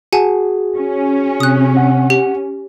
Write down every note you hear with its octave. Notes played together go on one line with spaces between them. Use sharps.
F#4 G#4 F#5 G#5 A5
C#4
C3 D#6 F#6
F#5
G4